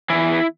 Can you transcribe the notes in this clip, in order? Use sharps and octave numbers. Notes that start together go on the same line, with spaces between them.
E2 C#3 E3 E4